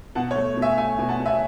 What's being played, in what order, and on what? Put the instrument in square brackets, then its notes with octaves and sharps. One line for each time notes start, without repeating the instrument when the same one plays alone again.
[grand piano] B2 F#5 A5
C#5
A3
B2
E5 G#5
A3 E5 G#5
B2
F#5 A5
B2
E5 G#5